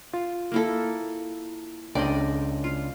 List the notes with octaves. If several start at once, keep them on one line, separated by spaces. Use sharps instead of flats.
F4
A#3 E4 A4
C#2 D4 D5 D#5 G5
F4